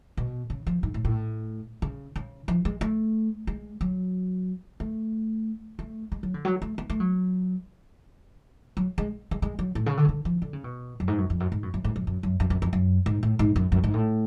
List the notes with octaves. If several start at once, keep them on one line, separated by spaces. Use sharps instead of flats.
B2
C#3
F3
G#2
A2
A2
C#3
C#3
F3
G#3
A3
G#3
F#3
A3
A3
G#3
F#3
D3
F#3
A3
B3
A3
F#3
F#3
G#3
G#3
G#3
F#3
A2
C#3
D3
C#3
D3
F3
D3
C#3
B2
F#2
G#2
F#2
F2
F#2
G#2
F#2
F#2
G#2
F#2
F#2
F#2
F#2
F#2
F2
F#2
G#2
A2
G#2
F#2
F#2
G#2
A2